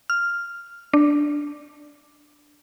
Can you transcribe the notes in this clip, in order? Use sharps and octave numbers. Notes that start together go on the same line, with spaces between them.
F6
D4